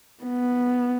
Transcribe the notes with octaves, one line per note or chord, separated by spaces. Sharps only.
B3